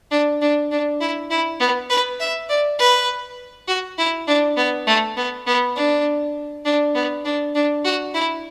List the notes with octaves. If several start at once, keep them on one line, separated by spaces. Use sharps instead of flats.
D4
D4
D4
E4
E4
B3
B4
E5
D5
B4
F#4
E4
D4
B3
A3
B3
B3
D4
D4
B3
D4
D4
F#4
E4